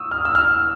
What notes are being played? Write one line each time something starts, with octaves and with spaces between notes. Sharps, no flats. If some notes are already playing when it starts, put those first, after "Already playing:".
Already playing: C#6 D#6 E6
F6
E6
F6